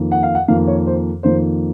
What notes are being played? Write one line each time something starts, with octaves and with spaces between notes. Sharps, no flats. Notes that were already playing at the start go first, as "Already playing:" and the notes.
Already playing: F2 D#3 A#3
F#5
F5
F#5
F2 D#3 A#3 F5
C#5
C5
F2 D#3 A#3 C5